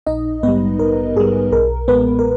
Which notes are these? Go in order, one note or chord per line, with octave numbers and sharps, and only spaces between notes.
A#1 D#4 D#5
G#2 G3 B3 B4
A#1 A#4
G#2 G3 G#4
B1 A#4
A#2 G#3 B3 B4
A#4